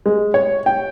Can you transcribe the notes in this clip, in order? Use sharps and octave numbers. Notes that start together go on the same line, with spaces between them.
G#3
C#5
G5